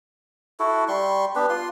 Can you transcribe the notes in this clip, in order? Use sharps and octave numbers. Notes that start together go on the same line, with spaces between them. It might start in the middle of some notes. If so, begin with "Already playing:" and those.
E4 F#4 A4
G3 C6 C#6
B3 D4 G4 B4
F4 C6